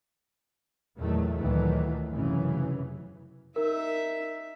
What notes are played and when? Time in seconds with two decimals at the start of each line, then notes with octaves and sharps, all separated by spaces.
0.96 E2 A#2 D#3 F#3 A3
1.38 D2 A#2 D#3 E3 F#3 A3
2.10 F1 F#2 C#3 E3
3.56 D#4 A#4 E5